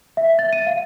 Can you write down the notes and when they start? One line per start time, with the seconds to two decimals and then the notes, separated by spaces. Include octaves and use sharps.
0.17 E5
0.39 A6
0.53 D#7
0.67 F5